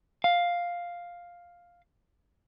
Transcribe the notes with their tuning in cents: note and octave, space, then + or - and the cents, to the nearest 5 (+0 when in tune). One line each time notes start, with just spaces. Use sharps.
F5 +5